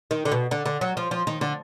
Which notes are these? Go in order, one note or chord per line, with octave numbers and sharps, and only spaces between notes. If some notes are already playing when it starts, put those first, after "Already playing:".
D#3
D3
B2
D3
D3
F#3
F3
F3
D#3
D3